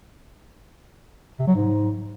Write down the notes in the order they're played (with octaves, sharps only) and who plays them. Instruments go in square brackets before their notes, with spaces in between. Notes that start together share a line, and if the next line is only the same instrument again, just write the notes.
[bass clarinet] C3
F#3
G#2